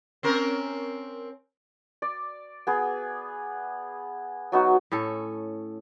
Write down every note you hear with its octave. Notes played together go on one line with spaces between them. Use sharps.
C4 C#4 A#4
D5
B3 G#4
F#3 B3 D#4 F#4
A2 C#4 A4